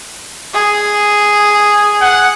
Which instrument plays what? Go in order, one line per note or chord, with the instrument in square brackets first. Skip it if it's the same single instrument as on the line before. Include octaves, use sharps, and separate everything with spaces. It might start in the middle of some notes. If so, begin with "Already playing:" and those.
[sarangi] G#4
[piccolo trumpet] F#5